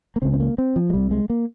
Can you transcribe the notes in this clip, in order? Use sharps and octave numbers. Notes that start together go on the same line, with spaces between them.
A#3
C#2 C#3 C4
C4
A#3
C4
F3
G#3
C2 C3 G3
G#3
A#3